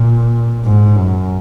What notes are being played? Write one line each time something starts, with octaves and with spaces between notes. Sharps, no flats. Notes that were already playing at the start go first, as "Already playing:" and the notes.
Already playing: A#2
G#2
F#2